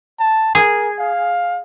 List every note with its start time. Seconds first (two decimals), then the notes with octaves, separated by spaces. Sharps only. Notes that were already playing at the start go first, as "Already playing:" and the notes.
0.20 A5
0.55 G#4 A#4
0.99 F5